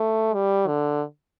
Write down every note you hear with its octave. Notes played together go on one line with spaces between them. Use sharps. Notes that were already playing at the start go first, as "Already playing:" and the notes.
Already playing: A3
G3
D3